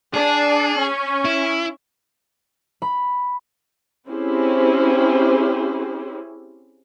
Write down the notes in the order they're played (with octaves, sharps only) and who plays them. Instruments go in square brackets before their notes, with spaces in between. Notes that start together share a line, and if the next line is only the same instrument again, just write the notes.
[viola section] D4 [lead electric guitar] G#4
[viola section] C#4
[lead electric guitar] E4
[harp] B5
[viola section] C4 C#4 E4 G4 G#4 C5